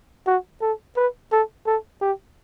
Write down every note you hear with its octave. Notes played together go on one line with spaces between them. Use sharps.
F#4
A4
B4
A4
A4
G4